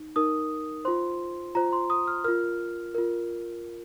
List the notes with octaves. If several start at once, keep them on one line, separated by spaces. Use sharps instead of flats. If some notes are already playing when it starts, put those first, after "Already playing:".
Already playing: D#4
D#4 A#4 D#6
F4 C5 C6
F4 C5 A#5
C6
D#6
F6
F4 A#4 F6
F4 A#4